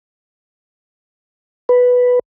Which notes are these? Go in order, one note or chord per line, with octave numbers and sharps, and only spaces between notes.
B4